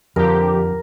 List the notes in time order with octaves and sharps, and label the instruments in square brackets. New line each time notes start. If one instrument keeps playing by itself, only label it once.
[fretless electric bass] F2 [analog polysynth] D3 F3 G4 [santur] A#4